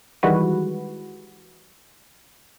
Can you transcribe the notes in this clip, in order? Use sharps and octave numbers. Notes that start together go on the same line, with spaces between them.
D#3 E3 G3 G#3 F#4 B4